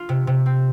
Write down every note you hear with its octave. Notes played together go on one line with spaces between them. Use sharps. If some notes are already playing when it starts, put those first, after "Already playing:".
Already playing: F4
C3
C3
C4